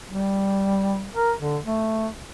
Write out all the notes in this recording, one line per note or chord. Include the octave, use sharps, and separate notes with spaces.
G3
A#4
D3
A3